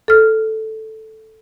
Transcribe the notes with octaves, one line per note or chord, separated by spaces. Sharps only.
A4 F6